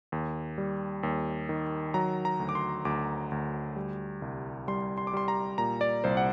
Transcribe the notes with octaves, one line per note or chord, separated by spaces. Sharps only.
D#2
G3
D#2
D#3
F#3 A#5
A#5
D2
D6
C6
D2 D6
D2
G3
C2
G3 C6
C6
D6
G3 C6
A#5
A#2 A#5
D5
C2 C5
F#5